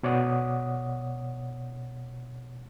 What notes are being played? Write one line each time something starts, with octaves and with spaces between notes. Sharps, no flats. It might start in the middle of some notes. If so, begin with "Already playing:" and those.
B2 C#5 D5 F#5 D#6